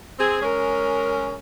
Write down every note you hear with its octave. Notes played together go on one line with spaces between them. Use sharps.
C4 G#4
G#3 C#4 A#4